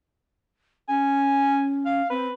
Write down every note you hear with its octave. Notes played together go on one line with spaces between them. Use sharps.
C#4 G#5
F5
C4 B4